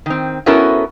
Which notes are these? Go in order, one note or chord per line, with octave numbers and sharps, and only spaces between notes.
D#3 C4
B3 C#4 E4 F#4 A4 A#4